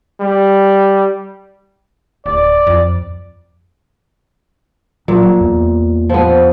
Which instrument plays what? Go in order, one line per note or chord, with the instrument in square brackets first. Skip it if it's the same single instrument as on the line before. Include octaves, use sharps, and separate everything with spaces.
[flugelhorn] G3
[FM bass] D1 [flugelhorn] D5
[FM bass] F2
[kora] A#2 [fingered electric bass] F#3
[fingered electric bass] E2
[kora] F3 B3